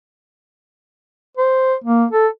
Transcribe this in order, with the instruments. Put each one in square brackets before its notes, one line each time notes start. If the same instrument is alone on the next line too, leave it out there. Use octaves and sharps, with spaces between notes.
[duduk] C5
A#3
A4